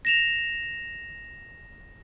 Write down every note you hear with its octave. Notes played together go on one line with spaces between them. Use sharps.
A#6 E7 F7